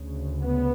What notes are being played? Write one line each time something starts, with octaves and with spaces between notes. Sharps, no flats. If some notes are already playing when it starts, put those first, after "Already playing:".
Already playing: D2 C#3
B3